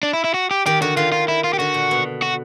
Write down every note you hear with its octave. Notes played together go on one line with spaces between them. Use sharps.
D4
E4
E4
F#4
G4
D#3 G4
D3 F#4
D#3 F4
F4
E4
F4
G4
D3 F#4
A#2
B2
F#4